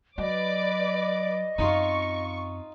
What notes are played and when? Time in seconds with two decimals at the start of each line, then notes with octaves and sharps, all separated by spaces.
0.18 F#3 B4 D5 D#5 D6
1.58 F#2 C4 D#4 F4 C#6